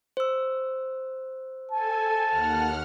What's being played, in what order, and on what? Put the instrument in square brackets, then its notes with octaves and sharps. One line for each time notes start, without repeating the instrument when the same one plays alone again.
[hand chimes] C5 E6
[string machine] A4 G#5 [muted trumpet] A5
[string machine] D#2 F#5 F6